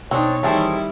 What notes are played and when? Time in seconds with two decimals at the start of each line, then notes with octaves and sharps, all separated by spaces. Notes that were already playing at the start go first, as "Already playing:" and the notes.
0.11 B2 C4 D4 D#4 C#5
0.43 D#3 E3 G3 A3 C4 E4 G#4